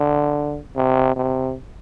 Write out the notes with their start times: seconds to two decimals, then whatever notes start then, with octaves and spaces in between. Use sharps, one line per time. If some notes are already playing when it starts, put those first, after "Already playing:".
Already playing: D3
0.76 C3
1.16 C3